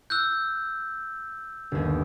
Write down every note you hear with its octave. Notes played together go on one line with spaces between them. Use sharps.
E6 F#6 G6
G1 D#2